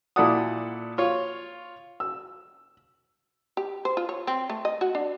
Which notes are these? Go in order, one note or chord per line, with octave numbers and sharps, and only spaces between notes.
A#2 E4 A4 D5 F#5 D#6
F4 C#5
E6
G4
C5
F4
C#5
C4
A3
D#5
F#4
D4